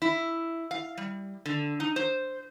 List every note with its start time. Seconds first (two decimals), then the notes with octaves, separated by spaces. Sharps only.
0.02 E4
0.71 F5
0.98 G3
1.46 D3
1.80 D#4
1.96 C5